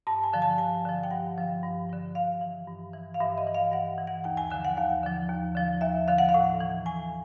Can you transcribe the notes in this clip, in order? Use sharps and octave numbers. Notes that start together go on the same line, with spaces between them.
G2 A5
G#5
D3 F3
A5
G2 G#5
D3 F3
G5
G2 F#5
D3 F3
G2
D3 F3
G2 F5
E3
G2
E3
F5
G2 E5
D#5
E3
F5
G2 F#5
E3
F#5
D#2 G5
G#5
D3 F3 G#5
F#5
D#2 F5
D3 F3
D#2
D3 F3
D#2 E5
D3 F3 F5
F#5
F5
A2
E3
A2 G#5